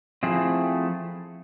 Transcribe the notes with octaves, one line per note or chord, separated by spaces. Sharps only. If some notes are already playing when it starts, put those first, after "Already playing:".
F3 A3 C4 E4 G#4